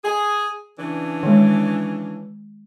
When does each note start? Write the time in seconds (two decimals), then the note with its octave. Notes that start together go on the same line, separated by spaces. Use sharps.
0.04 G#4
0.79 C#3 E3 D4
1.23 D#3 G#3